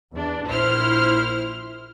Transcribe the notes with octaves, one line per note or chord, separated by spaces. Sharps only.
E2 D4
A#1 E4 C5 F6